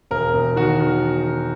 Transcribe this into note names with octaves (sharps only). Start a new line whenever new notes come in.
E1 A#4
E1
D#3 F#4
D#3